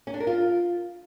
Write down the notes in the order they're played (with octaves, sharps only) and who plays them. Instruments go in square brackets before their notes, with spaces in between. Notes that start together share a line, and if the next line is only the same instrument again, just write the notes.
[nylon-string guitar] C#4
D4
A#4
F4